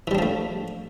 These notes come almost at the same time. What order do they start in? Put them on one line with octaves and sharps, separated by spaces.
E3 G3 D4 F3 A3